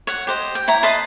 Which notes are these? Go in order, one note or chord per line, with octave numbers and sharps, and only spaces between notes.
C#5 F#5
G4 C5 D#5
G5
E4 C#5 A#5
B4 D#5 A5 C6